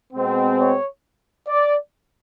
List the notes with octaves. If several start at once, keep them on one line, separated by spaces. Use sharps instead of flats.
B2 G#3 C4
C#5
D5